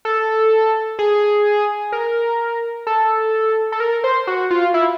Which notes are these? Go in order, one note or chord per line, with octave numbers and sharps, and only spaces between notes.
A4
G#4
A#4
A4
A4
A#4
C5
F#4
F4
E4